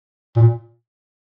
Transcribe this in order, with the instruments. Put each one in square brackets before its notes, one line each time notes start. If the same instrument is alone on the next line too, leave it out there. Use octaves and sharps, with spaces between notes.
[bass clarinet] A#2